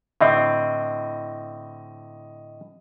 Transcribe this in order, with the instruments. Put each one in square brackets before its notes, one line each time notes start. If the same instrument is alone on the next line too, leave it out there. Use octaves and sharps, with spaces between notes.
[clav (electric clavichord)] A2 D3 C4 [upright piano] D#5